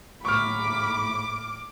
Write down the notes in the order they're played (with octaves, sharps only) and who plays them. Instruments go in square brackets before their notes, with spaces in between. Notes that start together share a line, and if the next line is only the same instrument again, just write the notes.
[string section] A2 [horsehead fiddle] A#3 B5 [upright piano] C#6 F6 [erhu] D6